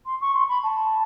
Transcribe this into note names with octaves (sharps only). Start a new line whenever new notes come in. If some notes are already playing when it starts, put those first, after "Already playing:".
C6
C#6
C6
B5
A5